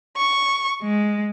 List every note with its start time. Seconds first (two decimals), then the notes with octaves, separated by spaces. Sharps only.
0.17 C#6
0.82 G#3